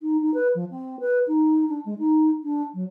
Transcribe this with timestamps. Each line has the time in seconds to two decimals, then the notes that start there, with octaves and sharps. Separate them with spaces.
0.02 D#4
0.21 D#4
0.34 B4
0.55 F3
0.71 C4
1.00 B4
1.27 D#4
1.69 D4
1.86 G#3
1.99 D#4
2.44 D4
2.74 F#3